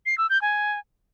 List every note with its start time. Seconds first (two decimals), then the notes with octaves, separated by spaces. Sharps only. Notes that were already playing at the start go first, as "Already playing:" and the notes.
0.06 C7
0.18 E6
0.30 G6
0.41 G#5